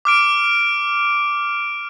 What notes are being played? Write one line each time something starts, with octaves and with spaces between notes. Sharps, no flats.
D6 F6 D7